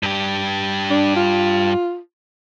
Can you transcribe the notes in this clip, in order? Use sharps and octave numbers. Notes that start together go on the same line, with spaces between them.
G2 G4
D4
F4